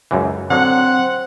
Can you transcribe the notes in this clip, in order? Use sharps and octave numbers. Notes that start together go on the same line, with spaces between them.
C#2 F#2 E3
D3 F#3 C4 F#5